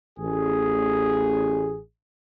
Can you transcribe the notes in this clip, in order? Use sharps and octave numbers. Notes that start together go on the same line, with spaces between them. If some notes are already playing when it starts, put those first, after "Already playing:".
A1 G#4